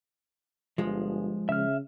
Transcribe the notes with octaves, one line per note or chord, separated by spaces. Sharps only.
G1 F3 G#3
C#3 E5 F6